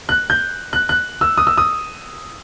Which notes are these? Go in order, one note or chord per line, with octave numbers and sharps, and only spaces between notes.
F#6
G6
F#6
F#6
E6
D#6
E6
D#6